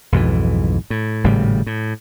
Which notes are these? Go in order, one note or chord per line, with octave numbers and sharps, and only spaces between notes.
B1 F2 G#2 E3
A2
G#1 A2 C#3 G3
A2